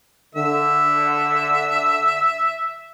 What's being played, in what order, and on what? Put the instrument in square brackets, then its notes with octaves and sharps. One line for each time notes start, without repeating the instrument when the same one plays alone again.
[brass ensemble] D3 [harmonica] E5